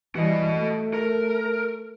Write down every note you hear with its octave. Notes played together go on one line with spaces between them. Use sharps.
E3 G3 F#4 D#5
A3
A#4